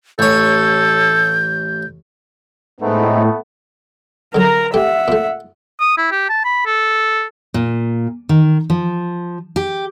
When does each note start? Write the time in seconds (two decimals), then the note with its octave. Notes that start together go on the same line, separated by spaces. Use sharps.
0.19 A1 A4 C#5 G6
2.81 A2 G#3 A3 B3 C4 D#4
4.35 D3 F#3 A#4 A#5
4.74 A3 G4 E5 F#5
5.08 A#2 A3
5.80 D#6
5.97 E4
6.12 G4
6.29 A5
6.45 B5
6.66 A4
7.54 A#2
8.29 D#3
8.70 F3
9.56 G4